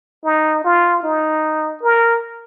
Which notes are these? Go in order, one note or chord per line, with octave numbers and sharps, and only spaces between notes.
D#4
F4
D#4
A#4